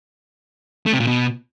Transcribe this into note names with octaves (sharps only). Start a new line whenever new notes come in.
A3
C3
A#2
B2